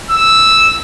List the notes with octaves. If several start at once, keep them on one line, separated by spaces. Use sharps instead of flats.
E6